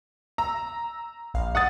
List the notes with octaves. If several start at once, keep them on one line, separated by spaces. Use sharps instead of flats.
A#5 E6
A#1 F5
F#5 D#6 A6